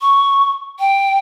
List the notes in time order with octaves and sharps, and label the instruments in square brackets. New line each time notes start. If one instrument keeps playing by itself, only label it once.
[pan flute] C#6
G5